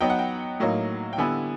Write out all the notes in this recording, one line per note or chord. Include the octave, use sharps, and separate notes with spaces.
F#3 B3 D#4 G5
F#5
G5
A2 F#3 A#3 D#4
G5
D3 G3 B3 E4 G#5